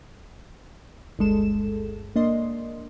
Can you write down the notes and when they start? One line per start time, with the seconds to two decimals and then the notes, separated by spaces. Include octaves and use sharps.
1.19 G1 D2 G2 G#3 A4 E7
2.16 A#3 D4 D#5 C6